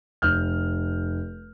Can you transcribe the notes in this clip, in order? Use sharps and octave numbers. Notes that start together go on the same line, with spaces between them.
F1 F6 G6